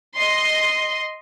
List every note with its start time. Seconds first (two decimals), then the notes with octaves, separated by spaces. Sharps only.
0.16 D#5 C6